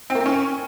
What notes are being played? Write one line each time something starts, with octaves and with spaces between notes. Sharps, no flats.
C4
A#3
C4
C#4